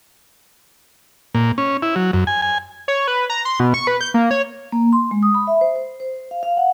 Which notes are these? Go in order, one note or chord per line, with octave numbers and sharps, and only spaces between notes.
A#2
C#4
E4
F#3
F#2
G#5
G#5
C#5
B4
A#5
C6
B2
C#6
B4
G6
A#3
C#5
A#3
C6
G#3
D#6
B5
E5
C5
C5
C5
F5
F5
F#5